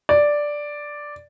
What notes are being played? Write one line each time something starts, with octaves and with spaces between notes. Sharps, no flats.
D5